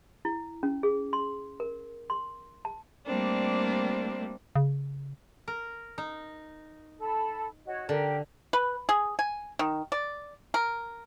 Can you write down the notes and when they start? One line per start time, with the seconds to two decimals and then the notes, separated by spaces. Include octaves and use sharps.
0.25 E4
0.63 C#4
0.83 G#4
1.13 C6
1.60 A#4
2.10 C6
2.65 A5
3.05 G3 A3 A#3 C4 D4
4.56 C#3
5.48 A#4
5.98 D#4
6.99 A4 B5
7.66 F#4 C#5 D#5
7.89 D3 G4 A#4
8.53 B4
8.89 G#4
9.19 G#5
9.59 D#3
9.92 D5
10.54 A#4